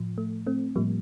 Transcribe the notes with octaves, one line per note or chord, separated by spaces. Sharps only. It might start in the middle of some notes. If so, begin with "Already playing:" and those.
Already playing: A2 F3
A3
A3 C4
A2 F3 G3 A#3